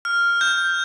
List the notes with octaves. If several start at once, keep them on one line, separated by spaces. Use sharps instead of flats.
F6
G6